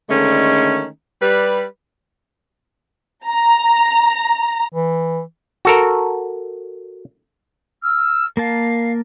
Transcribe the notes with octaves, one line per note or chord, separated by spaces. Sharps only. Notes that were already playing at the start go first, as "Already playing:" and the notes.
D3 D#3 G#3 A3 C#4
G3 B4
A#5
E3
F#4 A4 A#4
E6 F6
A#3 A#4 F5 A5